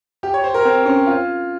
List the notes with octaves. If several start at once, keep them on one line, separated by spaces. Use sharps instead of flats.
G4
C#5
C5
A#4
C4
C#4
F4